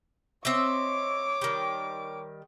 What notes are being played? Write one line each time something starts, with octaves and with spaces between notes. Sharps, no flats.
C4 C#5 D#5 E5 D6
D#3 G3